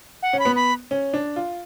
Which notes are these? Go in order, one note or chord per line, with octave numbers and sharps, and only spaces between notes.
F#5
C#4
B5
B3
B5
C#4
D4
F4